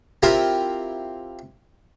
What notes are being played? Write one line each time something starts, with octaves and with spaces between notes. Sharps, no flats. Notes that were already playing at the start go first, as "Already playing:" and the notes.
C4 E4 F4 G4 A#4